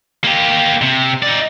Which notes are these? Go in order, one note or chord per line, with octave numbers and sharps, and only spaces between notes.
A#3 G4
C3
D#4 D5